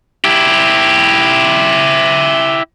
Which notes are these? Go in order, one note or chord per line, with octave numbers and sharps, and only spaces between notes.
E4 G4